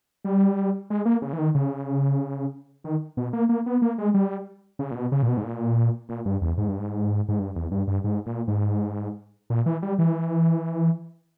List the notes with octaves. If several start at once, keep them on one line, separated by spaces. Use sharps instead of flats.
G3
G#3
A#3
C#3
E3
D#3
C#3
D#3
B2
A#3
A#3
B3
A#3
G#3
G3
C#3
A#2
B2
C#3
A#2
B2
G#2
A#2
A#2
G2
E2
G#2
G2
G#2
G#2
G2
E2
G2
G2
G#2
A#2
G#2
A#2
E3
G3
E3